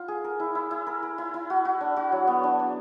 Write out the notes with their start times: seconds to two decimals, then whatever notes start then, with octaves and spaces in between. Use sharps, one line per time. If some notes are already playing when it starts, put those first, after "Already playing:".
Already playing: F4
0.08 G#4
0.24 A#4
0.40 E4
0.55 E4
0.71 E4
0.87 A#4
1.03 A#4
1.18 E4
1.34 E4
1.50 F#4
1.65 F#4
1.81 D4
1.97 F#4
2.12 F#3
2.27 B3
2.43 D4
2.59 D4